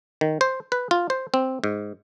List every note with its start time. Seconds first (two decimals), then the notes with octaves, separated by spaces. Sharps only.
0.21 D#3
0.41 C5
0.72 B4
0.91 F4
1.10 C5
1.34 C4
1.64 G#2